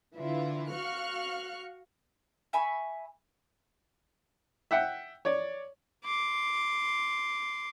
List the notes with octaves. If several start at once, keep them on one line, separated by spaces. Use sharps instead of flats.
D3 E3 E4 F4 E5
F#4 F5 C#6 F6 F#6
E5 G#5 B5 C#6
E5 F#5 G5
C#5 D5
C6 D6